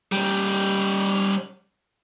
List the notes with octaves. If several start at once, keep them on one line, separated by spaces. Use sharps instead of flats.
G3 C#4